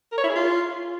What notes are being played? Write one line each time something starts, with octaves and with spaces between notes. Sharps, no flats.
A#4
C#5
E4
G#4
F4